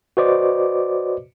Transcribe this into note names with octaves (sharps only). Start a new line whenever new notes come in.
F#4 B4 C5 D5 D#5 D6